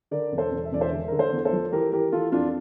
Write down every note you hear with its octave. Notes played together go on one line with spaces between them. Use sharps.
D3 A#4 D5
E1
A4 C5
E1
E5
E1 D5
C5 E5
D3
D3 A#4
A4 C5
E2
A4 C5
F3
E3 G4 A#4
E3 G4 A#4
E3 F4 A4
F2 D4 F4